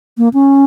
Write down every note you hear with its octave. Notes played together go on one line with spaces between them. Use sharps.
A#3
C#4